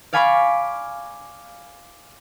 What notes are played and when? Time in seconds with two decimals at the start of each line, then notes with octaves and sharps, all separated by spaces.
0.13 D5 F5 G#5 B5 C#6 D6